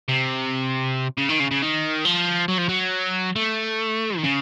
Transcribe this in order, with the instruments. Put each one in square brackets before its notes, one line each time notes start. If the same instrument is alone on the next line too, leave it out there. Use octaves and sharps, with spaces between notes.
[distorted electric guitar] C3
C#3
D#3
C#3
C#3
D#3
F3
F#3
F3
F#3
A3
D#3
C#3